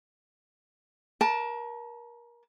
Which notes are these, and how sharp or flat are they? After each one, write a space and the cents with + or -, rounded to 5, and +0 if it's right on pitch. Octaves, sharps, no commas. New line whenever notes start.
A#4 +30 A5 -5